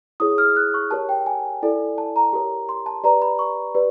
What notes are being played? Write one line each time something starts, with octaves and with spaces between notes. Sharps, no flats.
E4 G#4 C#5 D#6
F6
F#6
C#6
G4 A#4 C#5 A5
G5
G#5
E4 A4 D5
A5
A#5
G4 A#4 C#5
C6
A5
G4 B4 D5 A#5
B5
C#6
G4 B4 D5